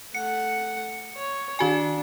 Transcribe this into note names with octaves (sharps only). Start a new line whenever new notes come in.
A3 F#5 C#7
C#5
D#3 D4 F#4 G#5